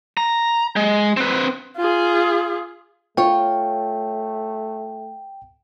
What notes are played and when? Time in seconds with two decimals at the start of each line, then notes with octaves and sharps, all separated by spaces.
0.17 A#5
0.76 G#3
1.17 C4 B4
1.77 F4 G#4
3.17 A3 F4 C#5 G5